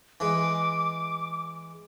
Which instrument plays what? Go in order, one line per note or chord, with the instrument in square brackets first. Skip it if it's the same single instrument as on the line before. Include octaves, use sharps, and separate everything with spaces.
[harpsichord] E3 G#3 [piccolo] D6